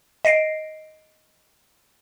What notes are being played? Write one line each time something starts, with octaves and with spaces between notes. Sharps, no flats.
D#5 A#6 C7 D7